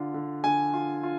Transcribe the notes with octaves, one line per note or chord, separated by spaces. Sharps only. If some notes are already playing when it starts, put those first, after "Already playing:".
Already playing: D3 D4 F4
D3
D3 G#5
F4
F4